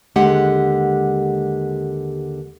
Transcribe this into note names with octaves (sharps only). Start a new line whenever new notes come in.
D#2 D3 G#3 G4 F#5